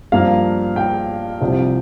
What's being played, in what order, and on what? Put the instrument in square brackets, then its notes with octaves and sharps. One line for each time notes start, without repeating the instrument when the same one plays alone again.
[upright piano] G2 F3 A#3 F5
G5
C2 C3 F3